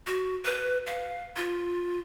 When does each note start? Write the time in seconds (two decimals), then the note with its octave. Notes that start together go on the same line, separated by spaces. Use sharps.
0.07 F#4
0.45 B4
0.86 F5
1.36 F4